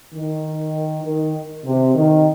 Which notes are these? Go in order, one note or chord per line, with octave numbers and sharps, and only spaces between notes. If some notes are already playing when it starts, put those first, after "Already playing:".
D#3
D#3
C3
D#3